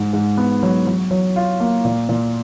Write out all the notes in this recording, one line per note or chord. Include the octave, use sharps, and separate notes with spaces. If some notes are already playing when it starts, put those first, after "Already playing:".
Already playing: G#2
G#2
B3
F#3
F#3
F#3
F4
A#3
A#2
A#2